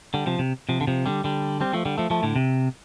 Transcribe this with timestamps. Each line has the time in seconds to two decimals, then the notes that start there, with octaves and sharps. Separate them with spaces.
0.14 D3 G3
0.26 C3 F3
0.39 C3
0.69 C3 F3
0.81 D3
0.87 C3 F3
1.06 D3 G3
1.24 D3 G3
1.61 G3 C4
1.74 F3 A3
1.85 D3 G3
1.98 F3 A3
2.10 F3 A3
2.23 A2 D3
2.36 C3